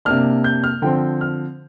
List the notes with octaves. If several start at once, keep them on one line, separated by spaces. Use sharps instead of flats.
C3 A#3 D4 F6
G6
F6
D3 F3 C4 G5
F6